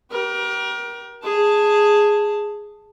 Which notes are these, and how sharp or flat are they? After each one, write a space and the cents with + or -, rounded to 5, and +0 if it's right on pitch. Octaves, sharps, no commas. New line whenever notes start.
G4 -30 A#4 +30
G#4 +0 A5 +0